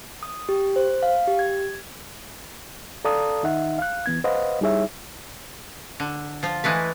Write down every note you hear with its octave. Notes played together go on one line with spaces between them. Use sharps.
D#6
G4
C5
F5
G4
G#6
A4 D5 F5 A5 A#5 D#6
D#3 D#4 E5 F#5
F5 F#6
E3 B3 G#6
B4 C5 D#5 F5 F#5
G3 D#4 E4 G#4 C#5 E5
D3
F3 F4
E3 G#3 A3 B4